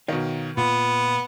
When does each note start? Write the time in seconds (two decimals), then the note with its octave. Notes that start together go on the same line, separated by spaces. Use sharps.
0.08 B2 D#3 C#5 D#5 F5
0.57 A#2 B3 F4